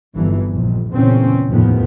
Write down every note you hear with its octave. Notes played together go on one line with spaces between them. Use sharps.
G1 F2 E3
A#1 F2
E2 A#2 C#3 C4 C#4
F1 D#2 A2 F3 B3